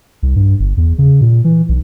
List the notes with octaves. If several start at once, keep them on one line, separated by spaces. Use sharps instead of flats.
C2
G2
G1
E2
C#3
A#2
E3
B1